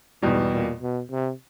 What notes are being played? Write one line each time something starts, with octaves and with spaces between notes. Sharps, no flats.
E2 G#2 B2 G3
A#2
B2
C3